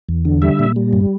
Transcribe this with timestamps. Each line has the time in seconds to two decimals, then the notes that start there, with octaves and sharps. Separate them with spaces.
0.09 E2
0.25 D3
0.42 G3 E5
0.59 A#2
0.76 G3
0.93 G2